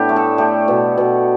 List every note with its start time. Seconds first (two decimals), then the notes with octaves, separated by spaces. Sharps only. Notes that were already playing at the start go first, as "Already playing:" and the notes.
Already playing: A2 B3 D4 G4
0.09 A3
0.16 A4
0.38 A3 G4
0.68 B2
0.97 B2